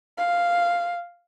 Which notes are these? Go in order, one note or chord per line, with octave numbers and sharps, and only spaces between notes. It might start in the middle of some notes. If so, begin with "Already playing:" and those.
F5